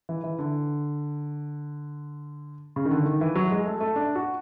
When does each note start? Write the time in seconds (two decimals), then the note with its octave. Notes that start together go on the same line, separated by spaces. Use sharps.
0.09 E3
0.24 E3
0.39 D3
2.76 C#3
2.85 D#3
2.91 D3
3.06 D#3
3.21 E3
3.35 F#3
3.51 G#3
3.66 A3
3.81 A3
3.96 D4
4.15 F#4